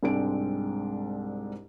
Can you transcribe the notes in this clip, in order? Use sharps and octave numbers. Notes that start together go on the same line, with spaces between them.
C2 G#2 G#3 C4 D4 D7